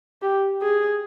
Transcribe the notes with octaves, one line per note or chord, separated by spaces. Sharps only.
G4
G#4